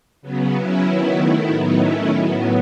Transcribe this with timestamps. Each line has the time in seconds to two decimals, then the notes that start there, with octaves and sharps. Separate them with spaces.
0.22 C#3 F#3 B3
0.53 F#3 C#4 E4
0.84 D#3 F#3 B3 E4
1.15 D#3 A3 E4
1.47 A2 F#3 B3 D#4
1.78 D#3 A3 C#4 E4
2.09 A2 F#3 B3